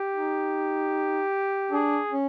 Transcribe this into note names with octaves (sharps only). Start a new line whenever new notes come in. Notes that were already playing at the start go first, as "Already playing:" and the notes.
Already playing: G4
D#4
D4 G#4
C#4